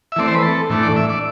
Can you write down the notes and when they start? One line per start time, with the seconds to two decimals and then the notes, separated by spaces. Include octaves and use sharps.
0.12 E5
0.16 E3 A3 C4 D5
0.27 C5
0.35 B4
0.43 A4
0.70 A2 E3 A3 D4
0.83 D5
0.96 E5
1.09 D5